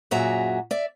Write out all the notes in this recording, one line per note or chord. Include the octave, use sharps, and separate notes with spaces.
F#2 A#2 F#4 G#4 E5 A#5
D5 E5